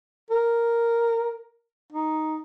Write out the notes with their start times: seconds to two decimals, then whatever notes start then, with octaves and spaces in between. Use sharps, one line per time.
0.31 A#4
1.92 D#4